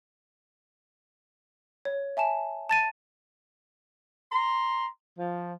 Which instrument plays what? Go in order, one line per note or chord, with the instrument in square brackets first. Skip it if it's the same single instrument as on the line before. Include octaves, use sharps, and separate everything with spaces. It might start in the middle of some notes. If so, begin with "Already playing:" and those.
[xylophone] C#5
E5 G#5 A5 E7
A5 A6 D#7
[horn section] A#5 C6
F3